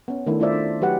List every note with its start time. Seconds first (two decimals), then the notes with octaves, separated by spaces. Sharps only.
0.08 B3 C#4
0.27 D#3 A3 D4 E4
0.40 A3 D#4 F4 C5 D5 E5
0.53 D4
0.81 F#3 G4 B4 F#5